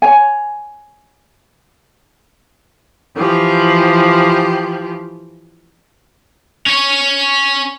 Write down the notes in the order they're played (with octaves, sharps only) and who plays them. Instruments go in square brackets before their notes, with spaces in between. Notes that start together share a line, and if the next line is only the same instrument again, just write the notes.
[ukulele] C#5 G#5
[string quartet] E3 F3 G4
[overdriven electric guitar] C#4 C#5